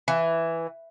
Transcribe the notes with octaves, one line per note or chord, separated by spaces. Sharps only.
E3